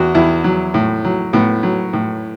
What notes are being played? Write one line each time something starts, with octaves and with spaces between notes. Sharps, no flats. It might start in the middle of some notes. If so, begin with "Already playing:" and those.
Already playing: E2 F#4
E2 E4
F#3
A2
F#3
A2 B3
F#3
A2